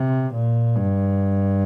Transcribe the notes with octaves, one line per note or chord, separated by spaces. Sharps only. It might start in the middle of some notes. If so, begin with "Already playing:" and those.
Already playing: C3
A#2
G2